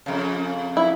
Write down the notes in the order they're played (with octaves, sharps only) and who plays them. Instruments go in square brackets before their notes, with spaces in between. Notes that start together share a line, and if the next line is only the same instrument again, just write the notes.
[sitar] F2 C#3
[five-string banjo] E4